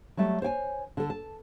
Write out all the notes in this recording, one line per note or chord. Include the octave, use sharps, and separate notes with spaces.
F#3 G3 A3
C5 C#5 G5 G#5
D3 A4
A5